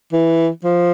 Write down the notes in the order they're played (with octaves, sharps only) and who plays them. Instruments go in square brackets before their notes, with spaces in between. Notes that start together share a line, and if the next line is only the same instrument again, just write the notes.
[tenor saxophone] E3
F3